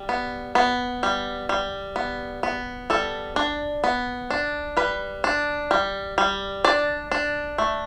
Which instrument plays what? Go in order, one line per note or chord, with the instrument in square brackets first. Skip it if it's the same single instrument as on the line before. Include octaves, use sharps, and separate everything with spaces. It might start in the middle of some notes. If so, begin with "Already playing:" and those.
Already playing: [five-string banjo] G3
B3
B3
G3
G3
B3
B3
G3 A4
D4
B3
D4
G3 B4
D4
G3
G3
D4 D5
D4
A3